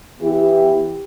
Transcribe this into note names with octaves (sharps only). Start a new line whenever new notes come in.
E3 B3 E4 G4